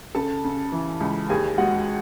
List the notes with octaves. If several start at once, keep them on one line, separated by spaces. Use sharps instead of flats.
C#3 A4 A5
C#3
E3
C#2
D#2 G#4 G#5
G#3 F#4 F#5